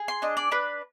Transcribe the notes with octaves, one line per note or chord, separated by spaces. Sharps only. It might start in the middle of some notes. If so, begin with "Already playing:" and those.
Already playing: G#4
C6
D4 D#5
D5
D4 B4